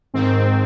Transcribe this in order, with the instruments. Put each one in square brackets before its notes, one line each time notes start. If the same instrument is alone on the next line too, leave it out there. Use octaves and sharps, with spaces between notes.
[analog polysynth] G#2 D#3 C4